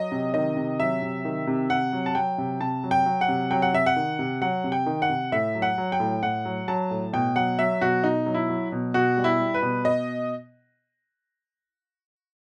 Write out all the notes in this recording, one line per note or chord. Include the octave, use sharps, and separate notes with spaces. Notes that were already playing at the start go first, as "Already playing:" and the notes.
Already playing: F#3 D#5
C3
D#3 D#5
C3
F#3 E5
C3
D#3
C3
C3 F#5
F#3
A5
F#3 G5
C3
C3 A5
F#3
G5
F#3
F#5
C3
F#3 G5
F#5
C3 E5
F#5
D#3
C3
F#3 F#5
C3
G5
D#3
F#5
C3
A2 E5
F#3
F#5
F#3
G5
A2
A2 F#5
F#3
F#3 A5
A2
B2 G5
F#3 F#5
F#3 E5
B2 F#4
B2 D#4
F#3
E4
F#3
B2
B2 F#4
G3
E4
G3
B4
B2
B2 D#5